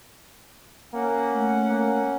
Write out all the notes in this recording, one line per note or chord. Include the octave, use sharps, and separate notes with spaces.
A#3 C#4 F#5
A3
A#3